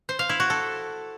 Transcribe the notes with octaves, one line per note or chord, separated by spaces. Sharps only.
C5
F5
E4
F#4
A4